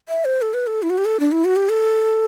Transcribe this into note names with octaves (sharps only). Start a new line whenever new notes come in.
E5
C5
A4
B4
A4
E4
F#4
G4
A4
D4
E4
F#4
G4
A4